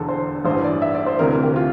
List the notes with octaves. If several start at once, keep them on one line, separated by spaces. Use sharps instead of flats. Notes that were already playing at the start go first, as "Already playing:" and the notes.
Already playing: E1 E2 D3 A4
C5
A1 G2 E3 C5
D5
E5
D5
C5
D2 C3 E3 A#4
A#4
G4
F4